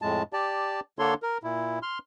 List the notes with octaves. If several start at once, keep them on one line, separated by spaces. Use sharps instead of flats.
F2 A2 G#3 A5
G4 D5 A5
D3 A#3 D4 A4 C#5 C6
A#4
A#2 E4
C6 F6